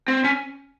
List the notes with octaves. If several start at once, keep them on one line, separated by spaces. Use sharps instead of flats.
C4
C#4